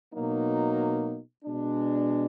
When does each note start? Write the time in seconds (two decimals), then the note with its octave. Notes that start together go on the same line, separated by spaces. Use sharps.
0.13 B2 F#3 A#3 D#4
1.45 B2 G#3 D4